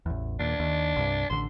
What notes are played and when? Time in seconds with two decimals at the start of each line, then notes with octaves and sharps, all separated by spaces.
0.06 A1 E2
0.39 D#2 A#2 D4
0.60 D#2
0.96 C2 G2
1.30 A1 D3 C6